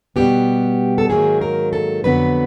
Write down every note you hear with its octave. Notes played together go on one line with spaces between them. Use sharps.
B2 G3 B3 G4
A4
G#2 D#3 F#3 A#3 G#4
A#4
A4
F2 D3 F#3 B3 B4